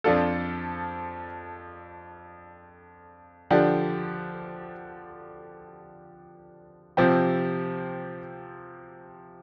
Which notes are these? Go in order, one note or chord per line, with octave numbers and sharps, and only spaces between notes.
F2 F3 D4 F4 A4
D3 F3 D4 G4
C3 F3 C4 G4